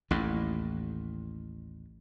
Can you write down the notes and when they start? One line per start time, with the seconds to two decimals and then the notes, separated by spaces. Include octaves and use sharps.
0.11 A1 D#2 A2